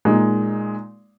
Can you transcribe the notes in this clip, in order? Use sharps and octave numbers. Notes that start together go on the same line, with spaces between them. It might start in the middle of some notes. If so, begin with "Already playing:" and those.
A#2 G#3 D#4